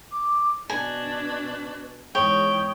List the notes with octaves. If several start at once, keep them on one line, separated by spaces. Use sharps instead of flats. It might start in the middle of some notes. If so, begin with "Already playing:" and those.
D6
B2 D4 B4 G#5
E2 G#2 C#5 G5 D#6